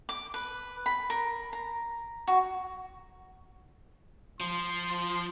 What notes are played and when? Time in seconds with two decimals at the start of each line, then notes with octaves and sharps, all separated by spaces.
0.09 D6
0.34 B4
0.86 B5
1.10 A#4
1.53 A#5
2.27 F#4
4.40 F3 C6